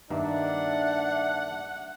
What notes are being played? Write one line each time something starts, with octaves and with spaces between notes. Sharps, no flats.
G2 D#3 A#3 D4 E5 F#5